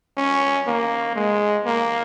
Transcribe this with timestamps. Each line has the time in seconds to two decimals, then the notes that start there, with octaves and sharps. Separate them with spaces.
0.17 C#4
0.66 A#3
1.15 G#3
1.65 A#3